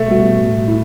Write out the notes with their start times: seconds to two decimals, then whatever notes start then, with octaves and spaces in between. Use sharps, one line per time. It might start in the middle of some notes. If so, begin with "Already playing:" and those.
Already playing: B2 A3
0.08 G3 B3 F#4
0.38 A2
0.68 E4